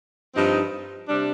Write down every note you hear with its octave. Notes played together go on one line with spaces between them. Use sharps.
G2 F3 C4 D#4
C3 G3 D4